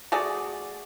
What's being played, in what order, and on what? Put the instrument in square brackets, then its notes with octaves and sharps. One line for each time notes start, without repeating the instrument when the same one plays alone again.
[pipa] A3 F#4 G#4 D5